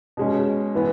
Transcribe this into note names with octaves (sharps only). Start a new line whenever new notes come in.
B2 G#3 C#4
E3 B3